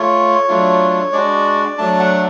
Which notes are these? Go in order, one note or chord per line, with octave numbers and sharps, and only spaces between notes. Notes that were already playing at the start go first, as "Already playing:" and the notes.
Already playing: A3 F4 C#5
F#3 A3 D4 F4
G#3 D4 F#4 D5
F#3 A3 D4 A5
F#5